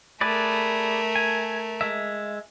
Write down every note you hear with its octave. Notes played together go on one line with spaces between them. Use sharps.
A3 G#4 A#4 B4 D5
G#5
G#3 E5